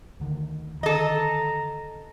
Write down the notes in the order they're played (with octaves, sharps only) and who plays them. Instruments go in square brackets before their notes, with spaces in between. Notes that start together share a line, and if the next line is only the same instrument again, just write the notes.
[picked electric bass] D2 D3 D#3
[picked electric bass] D3 D#3 [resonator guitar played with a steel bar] A4 D#5 [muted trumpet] A#5